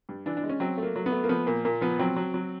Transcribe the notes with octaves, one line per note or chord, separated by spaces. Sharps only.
G2
E3 D4
D4
G#3
C#4
F#3 C4
A3
A#3
F#3
B3
A3
A#3
F3 B3
A#2 A#3
A#2 A#3
F3 B3
F#3 C4
F#3
F#3